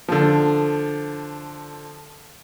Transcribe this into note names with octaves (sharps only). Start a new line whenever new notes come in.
D3 F3